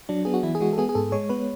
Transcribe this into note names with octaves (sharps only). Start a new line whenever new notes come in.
F#3 D4
B3 G#4
F#4
E3 E4
G#4
G#3 F#4
A4
B3 G#4
G#4
G#2 A4
G#3 C#5
B3 B4